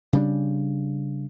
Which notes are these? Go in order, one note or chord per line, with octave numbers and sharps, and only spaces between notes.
C#3 G3 D4